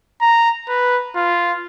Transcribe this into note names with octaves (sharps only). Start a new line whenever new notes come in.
A#5
B4
F4